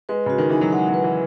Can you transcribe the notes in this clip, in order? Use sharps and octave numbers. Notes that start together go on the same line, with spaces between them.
G#3 B4
C#3 F#4
D#3
E3 D#4
F#3
G#3 F#5
F#3
B4
E3